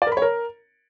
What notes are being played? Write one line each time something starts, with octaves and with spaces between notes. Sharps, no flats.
D5
A#4
B5
C#5
A#4